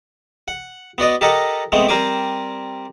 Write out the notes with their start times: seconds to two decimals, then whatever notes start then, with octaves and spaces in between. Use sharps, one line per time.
0.48 F#5
0.98 B3 F#4 D5 D#5
1.21 G4 A4 A#4 D#5 F#5
1.72 G#3 A3 B3 C4
1.89 G3 C4 A#4 C5 G#5 D6